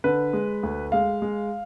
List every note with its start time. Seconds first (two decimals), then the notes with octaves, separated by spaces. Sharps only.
0.04 D3 B4
0.33 G#3
0.63 D2
0.92 G#3 F5
1.22 G#3